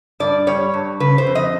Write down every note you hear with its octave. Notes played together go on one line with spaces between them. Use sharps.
G2 D5
G3 C#5
G2
C#3 B4
C5
F2
D#5